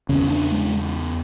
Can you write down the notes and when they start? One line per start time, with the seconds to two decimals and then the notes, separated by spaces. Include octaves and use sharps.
0.09 E2 C#3 C#4
0.30 D4
0.52 G#3